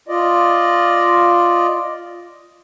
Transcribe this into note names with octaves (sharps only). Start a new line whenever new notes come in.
F4 D5 D#5